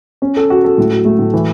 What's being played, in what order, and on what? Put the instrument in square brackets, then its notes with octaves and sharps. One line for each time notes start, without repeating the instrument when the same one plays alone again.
[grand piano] C#4
A4
F#4
A4
A2
F#3
A3
A2
E3